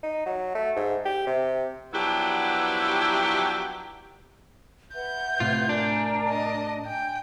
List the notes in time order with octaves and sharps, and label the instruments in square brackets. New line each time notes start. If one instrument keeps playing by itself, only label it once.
[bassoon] D#4
F#3
A3
G#2
G4
C3
[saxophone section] F3 F#3 B3 D4 E4 G4
[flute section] B4 E5 F#5 [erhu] G6
[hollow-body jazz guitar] A2 C3 [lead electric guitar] F4
[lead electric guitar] D4 [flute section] A#4 G#5 A#5
[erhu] D#5
[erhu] G5 [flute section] G#5